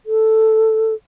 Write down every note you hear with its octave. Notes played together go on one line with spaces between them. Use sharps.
A4